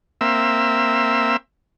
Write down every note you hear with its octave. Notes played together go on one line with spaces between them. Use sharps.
A#3 C4 E5 E6